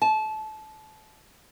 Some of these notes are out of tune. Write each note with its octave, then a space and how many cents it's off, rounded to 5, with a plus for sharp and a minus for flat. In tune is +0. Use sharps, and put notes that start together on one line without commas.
A5 -25